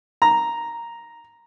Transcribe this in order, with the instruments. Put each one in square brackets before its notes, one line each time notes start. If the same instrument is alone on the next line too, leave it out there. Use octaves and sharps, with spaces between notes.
[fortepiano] A#5